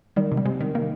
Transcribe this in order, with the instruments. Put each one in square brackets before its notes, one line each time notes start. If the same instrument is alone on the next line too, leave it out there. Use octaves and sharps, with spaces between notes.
[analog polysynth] D#3 [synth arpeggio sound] G3
[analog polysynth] C3
[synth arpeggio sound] G3
[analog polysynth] C3 [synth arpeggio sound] G#3
[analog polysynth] D#3
[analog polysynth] D#3 [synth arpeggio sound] A#3